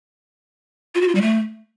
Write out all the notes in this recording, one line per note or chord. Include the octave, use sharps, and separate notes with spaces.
F4
F#4
F4
G3
A3